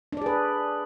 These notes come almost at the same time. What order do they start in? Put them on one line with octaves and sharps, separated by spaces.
D4 D5 G#4 B4